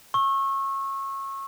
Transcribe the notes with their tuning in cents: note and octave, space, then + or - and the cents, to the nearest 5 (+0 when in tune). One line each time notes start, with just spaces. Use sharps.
C#6 -25 E6 +0